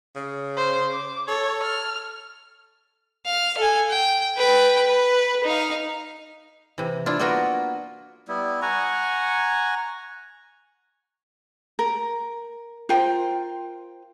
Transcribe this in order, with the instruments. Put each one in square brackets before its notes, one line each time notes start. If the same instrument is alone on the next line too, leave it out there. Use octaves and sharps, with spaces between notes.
[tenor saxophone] C#3
[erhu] C5
D6
[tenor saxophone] A4 [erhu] C#5
[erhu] F6
[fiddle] F5
A4 G#5
G5
B4 G5
B4
D#4 F5
[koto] C3 E3
D4 E4 F4
A#3 B3 F4 F#4 A#4 B4
[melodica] G3 B3 E4
F#5 G#5 A#5 C#6
[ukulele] A#4
F4 A#4 C5 G5